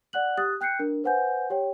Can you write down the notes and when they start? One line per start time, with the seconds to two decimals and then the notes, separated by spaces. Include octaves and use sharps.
0.13 D5 F#5 F#6 F#7
0.37 G4 D#6 F#6 A6
0.61 G5 F#6 G6 C7 C#7
0.79 D4 A#4
1.04 B4 C5 F#5 G#5 G6
1.50 G4 C#5 G5